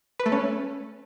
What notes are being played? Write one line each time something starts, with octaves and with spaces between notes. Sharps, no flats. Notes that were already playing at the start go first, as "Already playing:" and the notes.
B4
A3
C#4